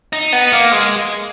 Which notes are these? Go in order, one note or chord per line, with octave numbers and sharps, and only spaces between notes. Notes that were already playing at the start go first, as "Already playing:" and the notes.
D#4
B3
A#3
G#3